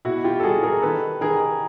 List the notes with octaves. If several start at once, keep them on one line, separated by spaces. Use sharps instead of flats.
B2 E4 F#4
F4 G4
A4
G3 F#4 G#4
G#4 A#4
D#3 A4 B4
D#3 G#4 A#4